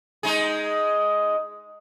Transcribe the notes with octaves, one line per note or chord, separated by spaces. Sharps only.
G#3 D#4 G#4